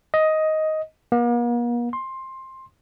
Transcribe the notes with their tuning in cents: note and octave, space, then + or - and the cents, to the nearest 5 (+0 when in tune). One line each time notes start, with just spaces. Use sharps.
D#5 +10
A#3 +45
C6 +15